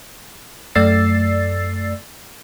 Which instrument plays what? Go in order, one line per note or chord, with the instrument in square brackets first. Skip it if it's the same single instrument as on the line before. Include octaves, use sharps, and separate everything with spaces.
[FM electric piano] F#2 A3 D5 E6 A6 C7